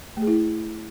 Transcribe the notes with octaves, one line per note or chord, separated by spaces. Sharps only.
A3
G#4
E4